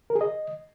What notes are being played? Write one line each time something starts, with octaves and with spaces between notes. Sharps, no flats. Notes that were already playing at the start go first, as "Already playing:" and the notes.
A#4
G#4
D#5